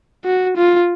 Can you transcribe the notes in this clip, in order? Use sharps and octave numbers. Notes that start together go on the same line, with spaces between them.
F#4
F4